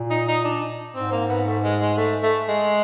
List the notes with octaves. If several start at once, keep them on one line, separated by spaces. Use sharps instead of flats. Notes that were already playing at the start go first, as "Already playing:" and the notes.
Already playing: A#2
D#4
D#4
D4
G#2 C4
A#3
B3
A3
G#3
G#3
A3
A3
G#3